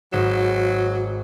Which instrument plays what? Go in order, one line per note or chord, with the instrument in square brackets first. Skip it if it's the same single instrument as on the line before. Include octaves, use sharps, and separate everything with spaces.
[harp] G#1 E7 [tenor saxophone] F#3